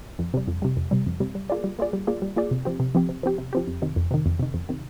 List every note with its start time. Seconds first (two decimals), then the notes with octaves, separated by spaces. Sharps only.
0.19 F2
0.34 C3 G3
0.48 F2
0.62 C3 G3
0.77 F2
0.91 C3 G3
1.06 F2
1.20 C3 G3
1.35 G3
1.50 A#3 F4 G#4 D5
1.64 G3
1.79 A#3 F4 G#4 D5
1.93 G3
2.07 A#3 F4 G#4 D5
2.22 G3
2.36 A#3 F4 G#4 D5
2.51 C3
2.65 F3 C4 G4
2.80 C3
2.95 F3 C4 G4
3.09 C3
3.23 F3 C4 G4
3.38 C3
3.53 F3 C4 G4
3.67 F2
3.82 C3 D#3
3.96 F2
4.11 C3 D#3
4.26 F2
4.40 C3 D#3
4.54 F2
4.69 C3 D#3